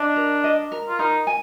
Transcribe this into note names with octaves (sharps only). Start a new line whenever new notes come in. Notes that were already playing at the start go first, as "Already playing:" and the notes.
Already playing: D4 D#5
A#4
D#5
A#4
F4
D#4 A#4
G#5